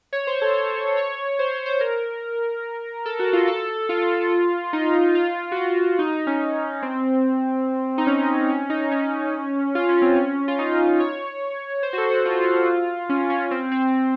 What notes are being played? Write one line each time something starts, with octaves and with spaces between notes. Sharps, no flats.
C#5
C5
A4
C5
C#5
C5
C5
C5
A#4
A4
F#4
F4
A4
F4
D#4
F4
F#4
F4
D#4
D#4
C#4
C4
D#4
C#4
C#4
D#4
C#4
F4
C#4
C4
C#4
F4
D#4
C#5
C5
F#4
A4
F#4
F4
C#4
C#4
C4
C4